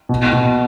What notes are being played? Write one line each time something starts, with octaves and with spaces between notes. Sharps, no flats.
B2
B2